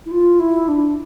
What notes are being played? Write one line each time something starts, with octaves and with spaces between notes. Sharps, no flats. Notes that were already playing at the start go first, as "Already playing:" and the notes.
E4
F4
E4
D4